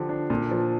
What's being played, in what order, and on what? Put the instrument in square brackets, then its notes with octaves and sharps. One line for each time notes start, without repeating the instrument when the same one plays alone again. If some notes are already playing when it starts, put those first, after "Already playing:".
Already playing: [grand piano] D3 F3 G4
D4
A#2
F3